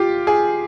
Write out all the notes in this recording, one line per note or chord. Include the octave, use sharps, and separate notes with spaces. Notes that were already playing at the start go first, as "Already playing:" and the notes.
Already playing: F4 G4
G#4